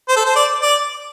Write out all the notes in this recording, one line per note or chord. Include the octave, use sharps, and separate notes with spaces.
C5
A4
C5
D5
D5